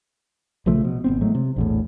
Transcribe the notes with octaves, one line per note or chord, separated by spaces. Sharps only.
A#1 C#3 F3 A3
B2
G#1 B3 C4
A2 F#3 G#3 A3
C3
A#1 E2 A2